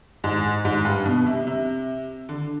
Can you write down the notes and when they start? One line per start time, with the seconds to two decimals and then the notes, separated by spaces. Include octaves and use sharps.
0.24 G#2
0.65 G#2
0.85 G2
1.06 B2
1.26 C3
1.47 C3
2.29 D3